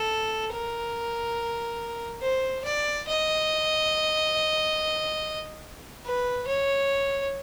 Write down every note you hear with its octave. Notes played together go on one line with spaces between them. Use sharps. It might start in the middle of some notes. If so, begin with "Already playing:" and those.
Already playing: A4
A#4
C5
D5
D#5
B4
C#5